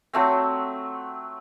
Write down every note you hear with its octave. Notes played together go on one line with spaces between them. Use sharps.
F#3 A3 C4